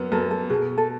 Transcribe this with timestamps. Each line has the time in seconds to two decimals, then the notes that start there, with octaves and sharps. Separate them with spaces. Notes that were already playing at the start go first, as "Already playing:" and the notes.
Already playing: F#2 B3
0.12 F#2 A4
0.31 A4
0.50 B2 G#4
0.78 A4